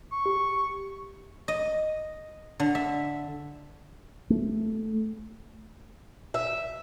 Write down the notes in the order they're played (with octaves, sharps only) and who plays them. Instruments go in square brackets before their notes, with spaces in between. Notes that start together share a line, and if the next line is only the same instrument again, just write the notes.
[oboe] C#6
[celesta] G4
[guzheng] D#5
D3
E5
[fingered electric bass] A3
[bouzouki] E5